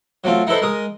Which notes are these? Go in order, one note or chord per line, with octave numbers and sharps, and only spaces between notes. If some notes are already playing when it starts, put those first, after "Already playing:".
F#3 A3 C4 F4
D#4 E4 A4 B4 C5
G#3 A#4 D#6